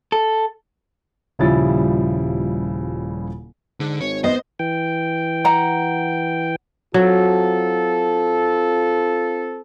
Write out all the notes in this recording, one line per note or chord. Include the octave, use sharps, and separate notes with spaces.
A4
D#1 C#3 F3 G3 E4 A6
G#2 D3
G#1 C#5
B3 C5 D#5
E3 G5
F#5 A#5
F#3 C4 F4 A4